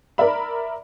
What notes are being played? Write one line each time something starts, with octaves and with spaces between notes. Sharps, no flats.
A#4 D5 E5 B5